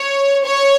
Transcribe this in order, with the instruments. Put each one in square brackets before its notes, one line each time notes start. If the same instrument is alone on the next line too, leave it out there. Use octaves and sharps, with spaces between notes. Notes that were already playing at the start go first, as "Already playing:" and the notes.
Already playing: [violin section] C#5
C#5